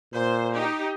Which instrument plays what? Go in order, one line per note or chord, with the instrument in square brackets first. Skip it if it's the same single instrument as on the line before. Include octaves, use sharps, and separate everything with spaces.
[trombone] A#2 [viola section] C5
[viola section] D#4 G4